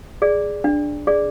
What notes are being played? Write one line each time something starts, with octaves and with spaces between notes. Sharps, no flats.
G#4 D5
D4
G#4 D5